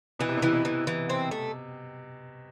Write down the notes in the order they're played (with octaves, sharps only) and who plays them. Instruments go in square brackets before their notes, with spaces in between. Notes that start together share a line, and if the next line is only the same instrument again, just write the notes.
[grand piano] B2 [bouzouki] E3
[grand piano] C3
B2
[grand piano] C3 [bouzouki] E3
[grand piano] B2
[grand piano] B2 [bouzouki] E3
[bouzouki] E3
C4
A3